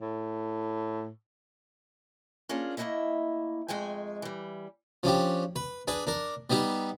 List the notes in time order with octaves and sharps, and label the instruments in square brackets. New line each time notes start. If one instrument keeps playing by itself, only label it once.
[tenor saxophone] A2
[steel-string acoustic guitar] A#3 C#4 D4 F4 G#4
A3 A#3 D4 E4 D#5 E5
F2 G#3 A3 G5 G#5
E3 G3
[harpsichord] F3 C#4 D4 G4
B4
D4 G#4 B4
D4 A#4
G3 B3 D#4 G4